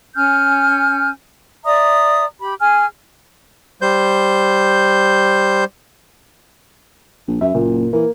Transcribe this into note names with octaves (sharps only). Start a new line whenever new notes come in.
C#4 G#5 F6 G6
D5 E5 A#5 D#6
G4 B5
G#4 G#5 F6
G3 C5 G6
A#1
F#2 E5
F#1 A#2
E3 A#3